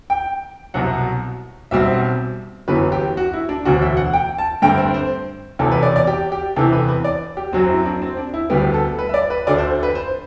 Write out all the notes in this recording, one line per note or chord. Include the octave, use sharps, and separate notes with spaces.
G5
C2 B2 F#3 F#5
B1 B2 G3 C4 E5
G1 F#2 E3 B3 B4
G4
F#4
E4
D4
E1 D2 D3 F#4
E5
F#5
G5
A5
G2 D3 A3 C4 G5
C5
C5
E1 E2 C3 A4
B4
D5
D5
G4
G4
E2 C3 E3 A4
B4
B4
D5
G4
F#2 F#3 C4 F#4
E4
D4
C4
D4
E4
D2 D3 G3 B3 G4
A4
B4
E5
D5
B4
D2 D3 A3 D5
C5
B4
C5